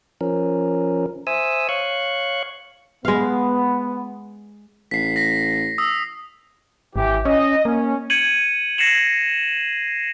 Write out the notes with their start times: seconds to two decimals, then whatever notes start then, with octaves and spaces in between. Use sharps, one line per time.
0.21 F3 C#4 A#4
1.27 C5 E5 G#5 D#6 E6
1.69 C#5 F5 C#6 F#6
3.05 G#3 B3 F5
4.91 A1 B6 C7
5.16 A#6 B6
5.78 D#6 E6
6.96 G#1 E3 G4
7.25 C#4 D#5
7.65 A#3 C#4
8.10 G#6 C#7 D#7 F#7
8.78 G#6 A#6 C7 C#7 E7 F#7